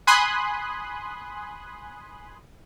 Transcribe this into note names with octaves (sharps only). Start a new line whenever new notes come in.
G#5 B5 C6 D#6 F#6